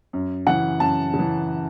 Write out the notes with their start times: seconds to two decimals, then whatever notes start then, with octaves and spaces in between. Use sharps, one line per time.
0.13 F#2
0.47 C#3 E3 F#5
0.80 F#2 A5
1.14 C#3
1.19 E3